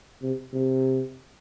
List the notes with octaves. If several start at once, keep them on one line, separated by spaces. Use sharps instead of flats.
C3
C3